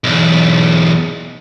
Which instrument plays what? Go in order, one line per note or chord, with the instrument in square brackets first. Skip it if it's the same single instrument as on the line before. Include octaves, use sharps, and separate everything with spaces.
[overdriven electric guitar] B1 E2